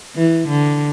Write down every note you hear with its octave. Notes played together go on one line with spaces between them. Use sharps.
E3
D3